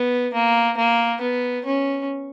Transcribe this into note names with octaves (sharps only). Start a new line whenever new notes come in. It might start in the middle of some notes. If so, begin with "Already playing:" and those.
Already playing: B3
A#3
A#3
B3
C#4